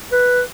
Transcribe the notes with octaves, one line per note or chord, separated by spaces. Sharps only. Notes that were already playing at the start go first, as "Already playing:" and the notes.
B4